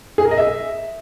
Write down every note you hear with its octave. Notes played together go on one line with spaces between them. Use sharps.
G#4
A#4
D#5
E5